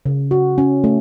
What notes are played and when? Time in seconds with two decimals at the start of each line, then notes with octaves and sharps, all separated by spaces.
0.06 C#3
0.31 F#4
0.58 C#4
0.84 A3